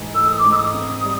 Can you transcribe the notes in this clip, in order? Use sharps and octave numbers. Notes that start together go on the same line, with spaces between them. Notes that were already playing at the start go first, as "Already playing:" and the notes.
Already playing: G#2 E3
A3 E6
D#6
D6
G#2
E6
D#6
C4
G3